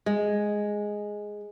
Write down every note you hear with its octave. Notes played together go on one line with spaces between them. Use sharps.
G#3